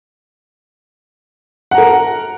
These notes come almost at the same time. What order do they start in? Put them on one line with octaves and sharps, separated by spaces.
F#5 A#5 A#4